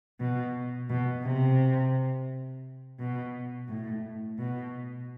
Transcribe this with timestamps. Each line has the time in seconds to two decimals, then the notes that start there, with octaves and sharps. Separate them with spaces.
0.20 B2
0.90 B2
1.24 C3
2.99 B2
3.69 A2
4.39 B2